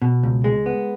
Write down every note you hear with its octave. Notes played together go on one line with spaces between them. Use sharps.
B2
C#2
G#3
B3